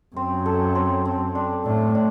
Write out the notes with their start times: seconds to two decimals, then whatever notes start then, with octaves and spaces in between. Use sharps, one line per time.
0.16 F#2 C4
0.46 A4
0.75 C4
1.05 C4
1.35 D4
1.65 A2 D4
1.95 D4